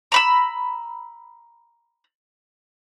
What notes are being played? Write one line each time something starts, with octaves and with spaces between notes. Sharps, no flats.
A#5 B5 E6